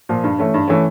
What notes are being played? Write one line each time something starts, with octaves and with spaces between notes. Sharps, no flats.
A#2 F3
G2
E3 A3 C#4
G2
E3 A3 C#4